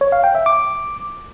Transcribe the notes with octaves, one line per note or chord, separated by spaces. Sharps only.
C#5
F5
G5
E5
D6